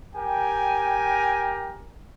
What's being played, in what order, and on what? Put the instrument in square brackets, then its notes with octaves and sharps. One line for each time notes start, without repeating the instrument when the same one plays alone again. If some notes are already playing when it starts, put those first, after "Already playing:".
[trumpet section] G4 A#4 G5 G#5